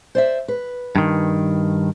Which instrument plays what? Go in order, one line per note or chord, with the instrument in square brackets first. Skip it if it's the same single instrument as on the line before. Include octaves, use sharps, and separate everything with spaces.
[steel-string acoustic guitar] C5 D5 E5
B4
[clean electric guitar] G2 D#3